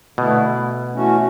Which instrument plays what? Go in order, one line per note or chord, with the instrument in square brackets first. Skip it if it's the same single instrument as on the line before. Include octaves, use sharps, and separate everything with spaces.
[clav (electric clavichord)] B2 [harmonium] D3 A3 E4
[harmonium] E3 A3 C#4 F#4